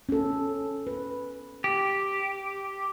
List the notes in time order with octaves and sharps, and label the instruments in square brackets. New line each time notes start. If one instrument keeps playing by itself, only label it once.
[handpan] C#4 A4
B4
[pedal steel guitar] G4